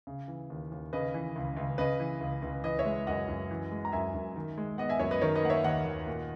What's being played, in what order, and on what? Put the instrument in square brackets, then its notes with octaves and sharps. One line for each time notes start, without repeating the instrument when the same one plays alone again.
[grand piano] C#3
E3
D#2
D#2
C#3 B4 D#5
E3
C#2
C#2
C#3 B4 D#5
E3
C#2
C#2
E3 B4 D#5
C#5 E5
G#3
F#2 D#5 F#5
F#2
E3
G#3
A#5
F#2 E5 G#5
F#2
D#3
G#3
B3 D#5 F#5
E5 G#5
F#2 C#5 E5
B4 D#5
D#3 A#4 C#5
B4 D#5
A#3 F#5
C#5 E5
D#2 D#5 F#5
D#2
A#2